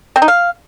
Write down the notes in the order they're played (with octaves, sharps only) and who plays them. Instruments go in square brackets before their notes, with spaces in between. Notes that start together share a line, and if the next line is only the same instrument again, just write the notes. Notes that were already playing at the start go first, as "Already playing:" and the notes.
[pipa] C4
D#4
F5